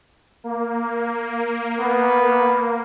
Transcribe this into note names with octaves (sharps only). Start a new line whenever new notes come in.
A#3
B3